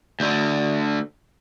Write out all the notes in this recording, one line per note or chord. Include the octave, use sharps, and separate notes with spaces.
D2 D3